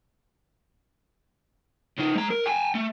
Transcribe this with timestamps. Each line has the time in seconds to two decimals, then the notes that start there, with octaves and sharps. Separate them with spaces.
1.99 C#3 D#4
2.16 G#3 A#5
2.30 A#4
2.46 G5 G#5
2.75 A3